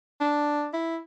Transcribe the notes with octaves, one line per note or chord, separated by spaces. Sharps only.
D4
E4